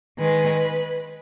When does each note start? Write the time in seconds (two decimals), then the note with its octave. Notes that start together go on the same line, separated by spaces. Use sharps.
0.18 D#3 G#3 B4